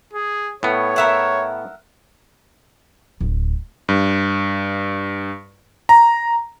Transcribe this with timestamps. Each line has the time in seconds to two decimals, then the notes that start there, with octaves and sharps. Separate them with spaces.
0.13 G#4
0.63 A2 B3 C#5
0.96 A#4 E5 F#5
3.21 D1
3.89 G2
5.89 A#5